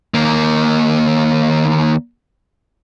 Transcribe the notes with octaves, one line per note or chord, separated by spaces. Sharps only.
D#2 A#3